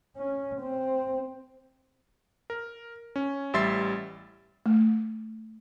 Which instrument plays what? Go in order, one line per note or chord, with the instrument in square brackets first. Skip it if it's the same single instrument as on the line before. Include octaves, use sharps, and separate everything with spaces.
[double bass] C#4
C4
[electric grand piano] A#4
C#4
A1 G3 E5 C6 A6 C7
[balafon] A3